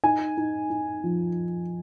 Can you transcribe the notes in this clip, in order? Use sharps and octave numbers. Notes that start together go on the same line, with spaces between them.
D#4 G#5
D#4
D#4
F3